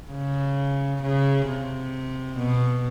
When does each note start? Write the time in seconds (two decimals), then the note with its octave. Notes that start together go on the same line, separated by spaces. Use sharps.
0.11 C#3
1.02 C#3
1.47 C3
2.37 B2